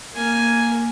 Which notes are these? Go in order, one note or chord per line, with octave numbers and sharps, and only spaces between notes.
A#3 G#5